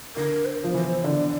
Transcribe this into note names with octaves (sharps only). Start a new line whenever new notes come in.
D3 A#4
C5
F3
E3 C5
D3 D5